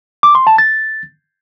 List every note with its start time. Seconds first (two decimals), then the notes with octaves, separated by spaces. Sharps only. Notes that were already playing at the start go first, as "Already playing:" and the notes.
0.23 D6
0.35 C6
0.47 A5
0.58 A6